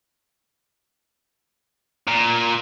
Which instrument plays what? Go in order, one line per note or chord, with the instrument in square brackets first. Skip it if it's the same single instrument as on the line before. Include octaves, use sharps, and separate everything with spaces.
[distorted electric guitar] A#2